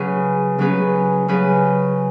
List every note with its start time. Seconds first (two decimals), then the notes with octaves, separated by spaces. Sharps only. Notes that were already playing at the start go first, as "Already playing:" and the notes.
Already playing: C#3 F#3 C#4 G#4 B4
0.58 C#3 F#3 C#4 G#4 B4
1.28 C#3 F#3 C#4 G#4 B4